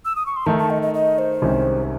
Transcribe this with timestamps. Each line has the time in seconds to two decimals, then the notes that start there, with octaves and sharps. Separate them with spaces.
0.05 E6
0.15 D#6
0.26 C#6
0.36 C6
0.46 D#3 A3 D#4 A5
0.58 A5
0.70 D#5
0.82 D#5
0.94 D#5
1.18 C5
1.42 C2 C3 D#3 G#3 C#4